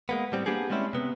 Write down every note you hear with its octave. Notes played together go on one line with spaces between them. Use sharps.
G#3 A#3 B3
A2 G3 C4
A#3 B3 D4 G4 G#4
G3 G#3 C4 C#4 E4
C3 B3